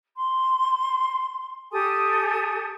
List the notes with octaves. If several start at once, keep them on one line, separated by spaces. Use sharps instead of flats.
C6
G4 A4 G#5 D#6